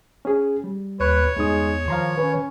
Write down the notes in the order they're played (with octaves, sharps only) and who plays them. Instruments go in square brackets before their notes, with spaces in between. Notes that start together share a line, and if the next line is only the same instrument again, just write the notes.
[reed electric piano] C#4 G#4
G3
[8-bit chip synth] D#2 F#6 [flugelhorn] B4 [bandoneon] C#5
[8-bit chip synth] E2 [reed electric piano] G2 D#4 D#6 [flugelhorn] G#3
[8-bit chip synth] D#3 [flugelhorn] F3 [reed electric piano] F5 A#5 C6
[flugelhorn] C#4 [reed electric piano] B4